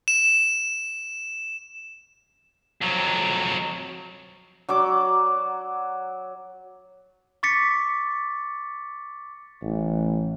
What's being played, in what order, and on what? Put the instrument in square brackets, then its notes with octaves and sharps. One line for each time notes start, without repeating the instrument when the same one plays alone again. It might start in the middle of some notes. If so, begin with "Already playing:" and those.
[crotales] E7
[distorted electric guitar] F2 F#3
[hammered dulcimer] F#3 D5 D6
[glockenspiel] C#6 D6 A6 B6 C#7
[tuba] A1